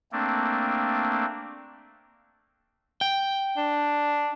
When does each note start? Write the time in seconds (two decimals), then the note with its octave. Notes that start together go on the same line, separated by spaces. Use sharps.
0.12 A3 A#3 C4 D4
3.01 G5
3.57 D4